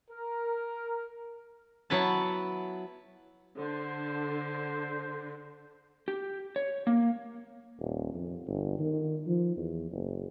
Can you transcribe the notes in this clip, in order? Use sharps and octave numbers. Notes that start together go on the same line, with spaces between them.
A#4
F#3 B3 E4 B4 F#5 A5
D3 C5
G4
C#5
A#3
D#1
F2
G1
D#3
F3
E2
F#1